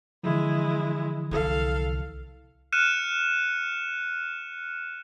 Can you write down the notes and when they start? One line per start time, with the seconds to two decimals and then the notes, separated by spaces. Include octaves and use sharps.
0.24 D3 E3 F3 G#3 E4
1.31 C2 A4 F5
2.72 F6 F#6 C#7 D#7 E7